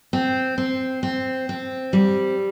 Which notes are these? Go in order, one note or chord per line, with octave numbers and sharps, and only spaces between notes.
C4
C4
C4
C4
G3